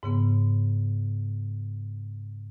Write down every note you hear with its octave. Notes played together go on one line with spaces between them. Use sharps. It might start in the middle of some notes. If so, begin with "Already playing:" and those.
G#2 C#3 B3